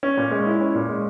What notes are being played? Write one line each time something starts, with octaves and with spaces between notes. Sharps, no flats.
C#4
A#2
G#3
E4
C#4
A#2
G#3